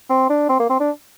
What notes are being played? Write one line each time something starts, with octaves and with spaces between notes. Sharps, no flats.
C4
D4
C4
A#3
C4
D4